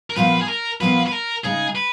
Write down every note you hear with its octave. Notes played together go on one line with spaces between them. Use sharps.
A#4
A#2 F3 B3 F4 B4
G#4
A#4
A#2 F3 B3 F4 B4
B4
A#4
C#3 G#3 D#4 G#4
B4